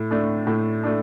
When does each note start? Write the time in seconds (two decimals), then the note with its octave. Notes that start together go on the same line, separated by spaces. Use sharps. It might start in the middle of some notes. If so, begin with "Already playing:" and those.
Already playing: A2
0.11 A3 D4
0.47 A2
0.83 A3 D4